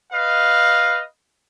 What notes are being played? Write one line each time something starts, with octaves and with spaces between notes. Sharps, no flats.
B4 D#5 F5